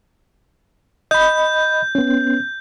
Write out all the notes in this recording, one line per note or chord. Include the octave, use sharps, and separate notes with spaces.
D#5 B5 G6
B3 C#4